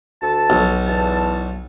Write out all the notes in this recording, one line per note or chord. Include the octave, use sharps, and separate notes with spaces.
D2 A4 A5
B1
E2 A5